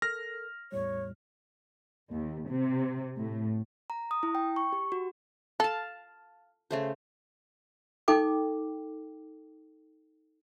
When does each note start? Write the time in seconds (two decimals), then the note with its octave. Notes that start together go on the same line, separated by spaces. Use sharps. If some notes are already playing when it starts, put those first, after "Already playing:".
0.02 A4 A#4 F6 A#6
0.72 E2 A2 G3 C#5
2.11 D#2
2.48 C3
3.17 A2
3.90 A#5
4.11 D#6
4.23 E4
4.35 G5
4.56 C#6
4.72 G4
4.92 F#4
5.60 A4 F5 A5
6.71 C#3 A3 C5
8.08 D#4 A4 G5 D6